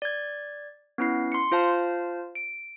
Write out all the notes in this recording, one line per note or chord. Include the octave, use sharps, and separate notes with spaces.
D5 G#6
B3 C#4 E4 C7
C6 C#7
F4 C5 F5 A5
D7